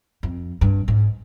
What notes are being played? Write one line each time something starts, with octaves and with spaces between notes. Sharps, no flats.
F2
G2
G#2